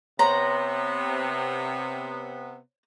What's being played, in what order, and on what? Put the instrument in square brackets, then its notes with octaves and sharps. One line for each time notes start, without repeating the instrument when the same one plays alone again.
[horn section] C3 B3 [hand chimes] C5 C#5 C6 [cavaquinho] A#5